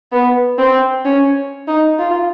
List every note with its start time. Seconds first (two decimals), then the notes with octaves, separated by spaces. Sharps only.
0.12 B3
0.58 C4
1.05 C#4
1.68 D#4
1.99 F4